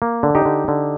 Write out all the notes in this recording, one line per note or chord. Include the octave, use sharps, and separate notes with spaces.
A#3
D3
D#4 G4
D3
D3